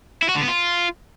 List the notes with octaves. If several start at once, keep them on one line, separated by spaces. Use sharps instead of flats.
E4
F#4
D3
B3
F4